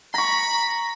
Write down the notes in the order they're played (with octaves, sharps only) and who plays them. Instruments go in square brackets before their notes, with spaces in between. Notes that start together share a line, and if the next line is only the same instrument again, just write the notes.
[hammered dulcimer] A#5 C#6 [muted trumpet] B5